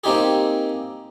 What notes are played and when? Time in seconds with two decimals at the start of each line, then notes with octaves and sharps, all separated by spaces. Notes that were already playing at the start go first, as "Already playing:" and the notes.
0.04 A#3 C4 D#4 G4 G#4